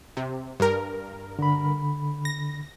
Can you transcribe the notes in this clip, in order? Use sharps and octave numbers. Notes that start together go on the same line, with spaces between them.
C3
G2 A#4
D3 B5
A#6